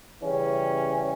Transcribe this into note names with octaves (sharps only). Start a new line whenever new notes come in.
C#3 E3 G3 C#4